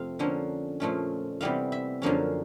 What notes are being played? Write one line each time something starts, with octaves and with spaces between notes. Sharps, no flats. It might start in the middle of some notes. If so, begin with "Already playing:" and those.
Already playing: F2 C3 A3 C4 F5
D3 F3 A#3 C#4
A#2 F3 A3 C#4
C3 E3 G3 B3 F5
E5
F#2 D3 F3 A#3 C#4 F5